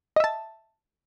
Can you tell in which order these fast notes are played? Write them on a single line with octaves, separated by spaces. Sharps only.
D#5 E5 A5